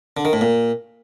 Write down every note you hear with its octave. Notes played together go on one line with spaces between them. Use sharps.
D3
D#3
A2
A#2